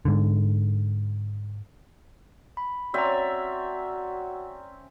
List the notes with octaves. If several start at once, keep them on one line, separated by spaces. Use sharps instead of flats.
G#2 D3
B5
C4 C#4 F#4 D5 E5 A#5